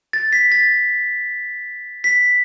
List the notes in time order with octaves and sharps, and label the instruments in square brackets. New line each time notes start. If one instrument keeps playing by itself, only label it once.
[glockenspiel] A6
B6
A6
B6